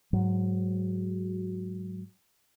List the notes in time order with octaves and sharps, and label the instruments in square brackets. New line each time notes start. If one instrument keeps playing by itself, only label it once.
[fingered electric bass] G#2 F#3